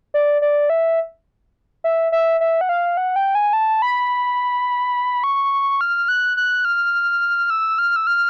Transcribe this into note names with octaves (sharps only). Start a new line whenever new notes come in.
D5
D5
E5
E5
E5
E5
F#5
F5
F#5
G5
G#5
A5
B5
C#6
F6
F#6
F#6
F6
E6
F6
E6
F6